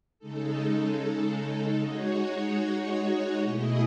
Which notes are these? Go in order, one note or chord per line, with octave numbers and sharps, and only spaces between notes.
C#3 G#3 D#4 A4
G#3 D#4 F#4 C#5
B2 A3 E4 G#4 D#5